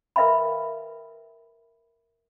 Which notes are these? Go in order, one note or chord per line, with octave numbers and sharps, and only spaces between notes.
A#4 B4 E5 F5 G5 B5